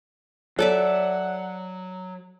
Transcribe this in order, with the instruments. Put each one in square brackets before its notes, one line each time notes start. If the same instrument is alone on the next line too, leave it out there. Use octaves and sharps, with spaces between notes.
[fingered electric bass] F#3 [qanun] A4 D5 E5 [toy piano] C#5 [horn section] F#5